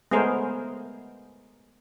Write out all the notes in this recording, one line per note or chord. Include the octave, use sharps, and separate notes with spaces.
G#3 A3 B3 G#4 A#4 C5